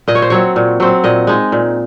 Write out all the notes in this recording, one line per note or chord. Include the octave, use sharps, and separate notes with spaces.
A#2 D#5
C#5
C5
F#3 C4 C#5
A#2
F#3 C4
A#2 D#5
G#3 D#4
A#2